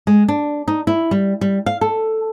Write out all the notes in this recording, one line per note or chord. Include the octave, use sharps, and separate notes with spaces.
G#3
D4
D#4
E4
G3
G3
F5
A4